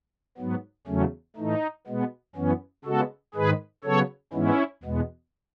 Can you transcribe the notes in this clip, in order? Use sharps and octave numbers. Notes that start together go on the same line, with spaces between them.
G#2 F#3 B3
E2 C#3 F#3 A3 C#4
A2 E3 A3 D#4
B2 G#3 B3
F#2 E3 B3 C#4
C#3 G#3 B3 F#4 A4
G#2 D#3 G#3 G#4 B4
C#3 F#3 B3 A4 C#5
G#2 E3 G#3 B3 C#4 E4
E2 B2 G#3 B3